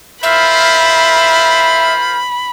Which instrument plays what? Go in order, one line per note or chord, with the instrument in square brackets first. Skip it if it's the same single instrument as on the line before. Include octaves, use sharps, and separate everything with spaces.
[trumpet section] F4 A#4 C5 [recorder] E5 [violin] B5